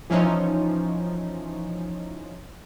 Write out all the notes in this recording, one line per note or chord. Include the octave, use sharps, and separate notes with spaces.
E3 F3 C#4 D#4